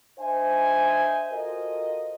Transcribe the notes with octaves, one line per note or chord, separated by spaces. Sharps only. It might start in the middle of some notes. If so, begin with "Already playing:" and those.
D4 C5 D#5 E5 G#5
F4 F#4 A4 A#4 C5 D#5